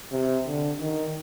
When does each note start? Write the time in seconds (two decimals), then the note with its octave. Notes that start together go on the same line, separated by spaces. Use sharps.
0.13 C3
0.47 D3
0.81 D#3